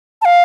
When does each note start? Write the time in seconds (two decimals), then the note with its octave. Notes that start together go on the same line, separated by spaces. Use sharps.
0.22 A5
0.25 F5